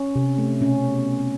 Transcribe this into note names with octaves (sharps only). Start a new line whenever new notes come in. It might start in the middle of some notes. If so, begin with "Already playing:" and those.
Already playing: C#4
C3
A3
B2 C#4